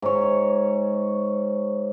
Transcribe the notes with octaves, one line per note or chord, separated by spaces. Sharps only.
G#2 C#5